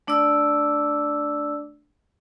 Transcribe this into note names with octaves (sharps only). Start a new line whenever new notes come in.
A3 D4 D5 D6 E6